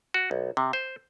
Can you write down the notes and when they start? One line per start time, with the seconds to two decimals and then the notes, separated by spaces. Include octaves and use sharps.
0.14 F#4
0.31 B1
0.57 C3
0.73 C5